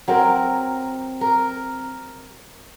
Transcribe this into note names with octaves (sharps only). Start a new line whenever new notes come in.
F#3 C4 A#4
A#4